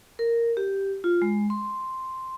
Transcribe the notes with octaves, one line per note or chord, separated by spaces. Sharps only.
A#4
G4
F4
G#3
C6